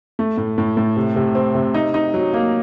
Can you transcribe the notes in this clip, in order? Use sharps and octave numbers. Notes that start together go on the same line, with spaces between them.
A3
A2
A2
A2
C3
C3
C4
C3
D#4
D#4
F#3
A#3